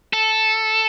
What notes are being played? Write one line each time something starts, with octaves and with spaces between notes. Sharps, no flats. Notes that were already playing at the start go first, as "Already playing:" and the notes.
A4